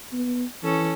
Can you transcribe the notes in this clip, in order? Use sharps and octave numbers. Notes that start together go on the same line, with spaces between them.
B3
E3 C#4 A4